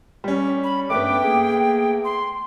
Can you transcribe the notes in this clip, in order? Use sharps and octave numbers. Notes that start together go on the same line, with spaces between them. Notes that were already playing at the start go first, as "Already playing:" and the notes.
G3 C#4
B5
G2 A3 B3 B4 G5 D6
A#3 G#4
C6